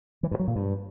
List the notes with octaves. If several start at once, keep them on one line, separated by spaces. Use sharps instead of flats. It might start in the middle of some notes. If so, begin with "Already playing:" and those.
E3
G2
F#3
A#2
G2